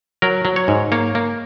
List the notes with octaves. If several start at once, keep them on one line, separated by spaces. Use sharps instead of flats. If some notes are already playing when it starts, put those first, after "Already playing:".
F#3 A#4
F#3
C#5
G#2
A#3 C#5
A#3